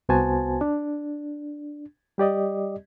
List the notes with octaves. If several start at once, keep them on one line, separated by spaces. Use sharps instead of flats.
C2 B3 F#4 C5 G#5 A5
D4
G3 G4 D5 D#5